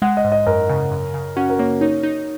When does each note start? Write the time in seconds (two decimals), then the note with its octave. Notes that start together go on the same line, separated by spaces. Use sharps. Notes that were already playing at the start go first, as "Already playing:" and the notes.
0.02 G#3 F#5
0.17 D#5
0.24 G#2
0.32 D#5
0.47 F#2 A#4
0.70 C#3
0.92 F#2
1.14 C#3
1.36 C#4 F#4
1.50 A#4
1.59 A#3 C#5
1.81 D#4 C#5
2.03 D#4